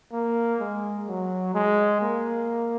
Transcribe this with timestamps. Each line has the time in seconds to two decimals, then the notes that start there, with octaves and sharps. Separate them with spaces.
0.12 A#3
0.60 G#3
1.08 F#3
1.54 G#3
2.02 A#3